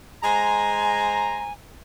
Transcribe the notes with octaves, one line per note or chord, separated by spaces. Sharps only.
G#3 C5 G#5 A#5